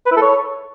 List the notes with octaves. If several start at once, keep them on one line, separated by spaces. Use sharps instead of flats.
B4
E4
A4
C#5